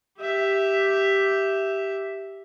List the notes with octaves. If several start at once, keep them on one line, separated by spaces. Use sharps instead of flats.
G4 E5